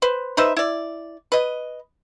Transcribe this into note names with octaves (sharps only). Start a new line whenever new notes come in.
B4 C5
D#4 B4 C5 E5
E4 D5
B4 D#5